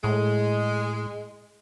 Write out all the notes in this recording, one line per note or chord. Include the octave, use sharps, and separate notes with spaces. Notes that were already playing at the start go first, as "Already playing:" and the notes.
A2 G#3